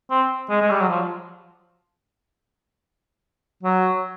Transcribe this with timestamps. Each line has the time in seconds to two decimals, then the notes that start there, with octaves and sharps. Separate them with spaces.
0.10 C4
0.49 G#3
0.62 G#3
0.70 G3
0.80 F#3
0.88 F3
3.63 F#3